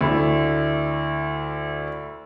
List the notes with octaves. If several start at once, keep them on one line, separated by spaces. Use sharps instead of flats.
D2 E4